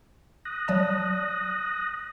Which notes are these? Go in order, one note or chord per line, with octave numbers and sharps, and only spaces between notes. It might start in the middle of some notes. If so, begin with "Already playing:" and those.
D#6 F#6 A#6
F#3 D5 A5